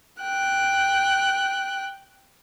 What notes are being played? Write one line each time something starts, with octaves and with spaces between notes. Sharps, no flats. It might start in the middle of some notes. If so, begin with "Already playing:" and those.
G5 F#6